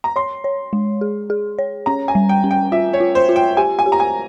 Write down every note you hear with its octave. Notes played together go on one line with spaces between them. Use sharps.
A#5
C#5 C6
C#5
G#3
G#4
G#4
C#5
C#4 A#5
G#5
G3
G5
C#4
G5
F4 E5
C#5
F4
C5
F4
G5
G4 G#5
G#5
G4
A#5
G#5